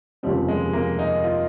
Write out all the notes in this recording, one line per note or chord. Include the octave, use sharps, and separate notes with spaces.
F1 D#2 C#3 F3 G3 C4
G#3
A#3
D#4
F4